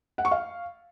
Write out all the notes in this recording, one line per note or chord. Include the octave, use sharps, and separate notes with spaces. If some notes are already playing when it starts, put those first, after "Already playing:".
F#5
C#6
F5